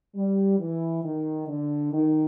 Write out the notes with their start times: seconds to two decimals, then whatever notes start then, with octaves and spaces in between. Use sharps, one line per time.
0.15 G3
0.59 E3
1.04 D#3
1.48 D3
1.93 D#3